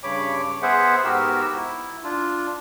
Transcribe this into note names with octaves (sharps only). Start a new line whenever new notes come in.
G2 C#3 C#5 B5 D6
B3 G#4 C5 E5 F#5
G#2 B3 F#4 G4 A#4 E6
E4
D4 F4